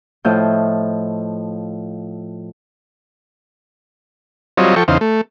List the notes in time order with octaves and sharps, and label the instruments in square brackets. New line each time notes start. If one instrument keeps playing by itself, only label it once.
[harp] A2 F3 E4 F4 D#5 G6
[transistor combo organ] F#3 G3 C4 F4 C#5 D#5
F3 A4 G5 C#6
E2 C#3 D#4 C5 F5
A3